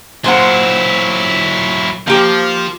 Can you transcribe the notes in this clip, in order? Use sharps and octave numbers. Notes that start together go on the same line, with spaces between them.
A#2 F#3 E4 C5 F#5
F3 A#3 G4